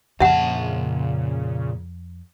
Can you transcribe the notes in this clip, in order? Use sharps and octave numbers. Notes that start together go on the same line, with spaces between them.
F2 A#2 C#3 E5 F#5 A5